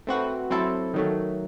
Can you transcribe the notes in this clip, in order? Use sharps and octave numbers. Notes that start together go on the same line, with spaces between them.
A3 C4 F#4 B4
F#3 C4 E4 A4
D#3 F#3 A3